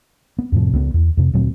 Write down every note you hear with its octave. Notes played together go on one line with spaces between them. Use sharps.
B3
F2 A2 C3 F3
C#2 B3
E2
F2 C3
D2 A#2 F#3 C4